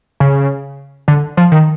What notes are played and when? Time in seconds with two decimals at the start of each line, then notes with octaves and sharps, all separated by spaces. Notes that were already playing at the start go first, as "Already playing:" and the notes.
0.20 C#3
1.08 D3
1.37 F3
1.52 D#3